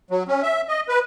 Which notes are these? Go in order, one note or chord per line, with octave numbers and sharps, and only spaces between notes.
F#3
C#4
E5
D#5
B4